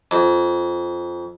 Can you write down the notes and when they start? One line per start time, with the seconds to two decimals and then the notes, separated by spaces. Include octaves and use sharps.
0.11 F2